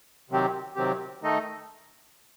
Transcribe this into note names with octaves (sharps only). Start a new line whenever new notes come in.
C3 D#3 F#3 C4 G4
C3 D#3 F#3 C4 G4
D#3 A3 D#4 A4 D#5